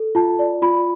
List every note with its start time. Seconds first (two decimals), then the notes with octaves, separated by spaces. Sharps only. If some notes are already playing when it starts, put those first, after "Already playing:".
Already playing: A4
0.15 F4 A5
0.39 D5
0.62 F4 B5